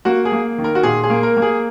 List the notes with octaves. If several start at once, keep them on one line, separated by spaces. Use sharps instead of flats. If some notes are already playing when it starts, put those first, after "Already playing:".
A#3 F#4
G#4
A#3
D#3
A#4
F#4
A#2 G#4
G#4
A#3
A#4
A#3
G#4